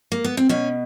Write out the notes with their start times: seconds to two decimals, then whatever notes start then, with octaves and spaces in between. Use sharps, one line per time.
0.12 A#3
0.24 B3
0.37 C4
0.49 B2 C#4